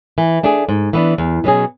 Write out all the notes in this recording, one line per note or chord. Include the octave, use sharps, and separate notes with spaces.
E3
A3 D4 G#4
G#2
E3 B3 D4
E2
B2 F#3 C#4 G#4